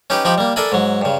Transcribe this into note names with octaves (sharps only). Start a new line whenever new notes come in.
C#4 D#4 G4 B4
F3 D#4 G4 B5
G3 A#3
D4 A4 A#4 E5 G#5 B5
G#2 F#3
G2 C#3